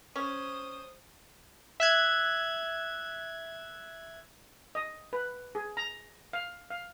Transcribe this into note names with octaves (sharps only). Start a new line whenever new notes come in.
C#4 C5 D#6
E5 F#6 G#6
D#5
B4
G#4
A#5
F5
F5